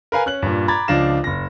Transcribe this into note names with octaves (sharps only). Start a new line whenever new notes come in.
A#4 B4 F5 G#5
C#4 F#6 F#7
G2 A#2
A#5 B5 D6 G#6 A6
C#2 F3 D4 F5 A#6 E7
F#1 A#6